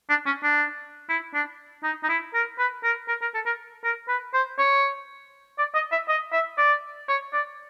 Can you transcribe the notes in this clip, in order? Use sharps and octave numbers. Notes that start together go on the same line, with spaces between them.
D4
C#4
D4
E4
D4
D#4
D#4
E4
A#4
B4
A#4
A#4
A#4
A4
A#4
A#4
B4
C5
C#5
D5
D#5
E5
D#5
E5
D5
C#5
D5